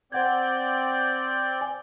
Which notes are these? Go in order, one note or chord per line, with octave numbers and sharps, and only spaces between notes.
C4 C5 D5 F#5 G6 G#6
G#5